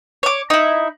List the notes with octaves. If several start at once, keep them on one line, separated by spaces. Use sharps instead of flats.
C#5 D6
D#4 E4